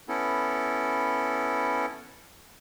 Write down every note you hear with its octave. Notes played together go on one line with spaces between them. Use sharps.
B3 C#4 E4 A4